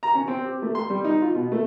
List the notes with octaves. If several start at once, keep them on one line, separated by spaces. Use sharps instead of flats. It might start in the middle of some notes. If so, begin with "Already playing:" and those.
A#5
C#4
C4
G4
A3
C6
G3
D#4
F4
B2
A3